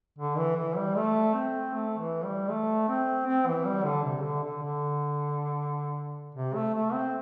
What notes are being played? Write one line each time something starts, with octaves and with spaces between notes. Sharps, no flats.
D3
E3
E3
G3
A3
C4
A3
E3
G3
A3
C4
C4
E3
G3
D3
C3
D3
D3
D3
C3
A3
A3
C4